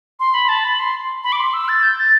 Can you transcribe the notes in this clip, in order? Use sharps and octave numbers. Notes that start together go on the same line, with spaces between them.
C6
B5
A5
B5
C6
B5
D6
C6
E6
A6
G6
A6